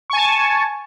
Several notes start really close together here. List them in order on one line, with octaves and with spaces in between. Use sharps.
C#6 G#5 A5